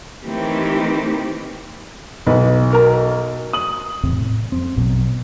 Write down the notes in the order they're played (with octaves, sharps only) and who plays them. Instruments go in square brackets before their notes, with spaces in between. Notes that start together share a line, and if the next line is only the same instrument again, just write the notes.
[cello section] D#3 E3 A3 C4 G4
[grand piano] B1 [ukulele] B4
[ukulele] F#4 A#4 A#5
[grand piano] D#6 F#7
[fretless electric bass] E2 A2 C3 C4
A2
F2 C4
A#1 B2 F3 F#3